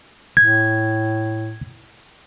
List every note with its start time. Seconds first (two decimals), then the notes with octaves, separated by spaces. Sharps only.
0.37 A2 G#6